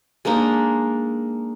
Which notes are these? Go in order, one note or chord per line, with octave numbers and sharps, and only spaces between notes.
G#3 A#3 D4 D#4